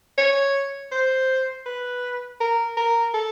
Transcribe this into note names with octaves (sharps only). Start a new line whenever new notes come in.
C#5
C5
B4
A#4
A#4
A4